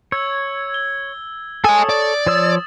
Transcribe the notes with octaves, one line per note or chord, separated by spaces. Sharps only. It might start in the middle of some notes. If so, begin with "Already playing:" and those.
C#5 E6 G#6
G7
A4 C#5 D#5 G#5 D#6
D5
F3 C#5 D#6 E6 A6 E7